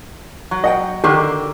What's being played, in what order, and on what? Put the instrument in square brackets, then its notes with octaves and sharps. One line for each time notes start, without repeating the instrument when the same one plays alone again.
[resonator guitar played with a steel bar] F#3
[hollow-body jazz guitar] D#5 F#5 G5
[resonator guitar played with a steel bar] D3 D#3 A#3 [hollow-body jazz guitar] G4